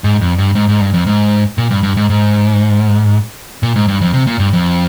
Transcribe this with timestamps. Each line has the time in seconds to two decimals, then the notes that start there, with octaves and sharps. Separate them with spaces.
0.04 G#2
0.21 F2
0.38 G2
0.55 G#2
0.69 G#2
0.81 G2
0.94 F2
1.07 G#2
1.58 A#2
1.71 G2
1.83 G2
1.97 G#2
2.10 G#2
3.63 A#2
3.76 G#2
3.88 G2
4.02 F2
4.14 C3
4.27 A#2
4.39 G2
4.53 F2